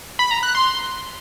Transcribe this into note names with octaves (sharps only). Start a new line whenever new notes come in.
B5
A#5
F#6
C6